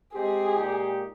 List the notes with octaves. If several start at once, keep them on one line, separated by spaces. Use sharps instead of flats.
G#3 C4 G4 G#4
A#2 G#3 D#4 G4